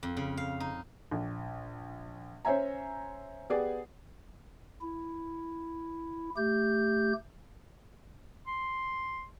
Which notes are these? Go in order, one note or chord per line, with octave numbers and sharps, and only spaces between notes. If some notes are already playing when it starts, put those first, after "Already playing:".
F2
C#3
F5
D#4
A#1
C#4 C5 C#5 E5 G#5 A#5
B3 G4 G#4 D5
E4
A3 G4 G6
C6